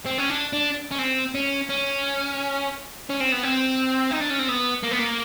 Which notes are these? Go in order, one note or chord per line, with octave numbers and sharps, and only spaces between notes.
C4
C#4
D4
D4
C#4
C4
C#4
C#4
C#4
C4
B3
C4
D#4
D4
C#4
C4
B3
A#3
B3
A#3